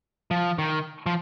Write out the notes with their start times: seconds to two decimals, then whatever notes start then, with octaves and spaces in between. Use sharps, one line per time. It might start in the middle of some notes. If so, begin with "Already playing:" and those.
0.31 F3
0.58 D#3
1.06 F3